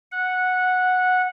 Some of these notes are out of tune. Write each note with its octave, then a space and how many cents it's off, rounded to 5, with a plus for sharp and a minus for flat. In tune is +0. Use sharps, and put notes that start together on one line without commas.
F#5 -10